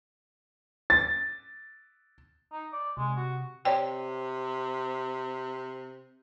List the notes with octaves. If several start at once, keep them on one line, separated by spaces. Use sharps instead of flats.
A6
D#4
D5
C3 G#3
F#4
C3 C#5 D5 G5